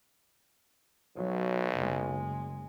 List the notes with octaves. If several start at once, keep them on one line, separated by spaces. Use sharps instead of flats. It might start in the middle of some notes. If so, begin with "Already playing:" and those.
B1 F#3
F#1 G#3